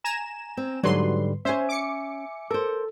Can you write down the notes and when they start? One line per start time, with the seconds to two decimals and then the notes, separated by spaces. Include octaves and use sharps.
0.04 G#5 A#5 E7
0.57 C4
0.83 G#2 D3 F#3 G3 B4 C6
1.45 C#4 C5 C#5 E5 G#5
1.69 D6 C#7
2.51 A4 A#4 C5